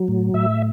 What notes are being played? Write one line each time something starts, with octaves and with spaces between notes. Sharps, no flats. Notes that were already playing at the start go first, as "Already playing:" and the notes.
Already playing: F#3
A2
A2 E5